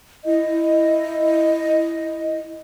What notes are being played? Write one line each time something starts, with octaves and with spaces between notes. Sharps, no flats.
E4 D#5